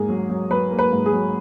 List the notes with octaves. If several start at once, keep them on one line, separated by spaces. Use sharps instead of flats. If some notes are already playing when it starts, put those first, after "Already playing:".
Already playing: G#2 A#3 G#4
F#3
F#3
F#3 B4
A#3
B4
G#2
G#4
F#3